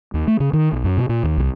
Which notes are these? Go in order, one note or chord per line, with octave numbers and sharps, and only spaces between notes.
D#2
A3
C#3
D#3
B1
F#2
B2
A#2
D#2
C2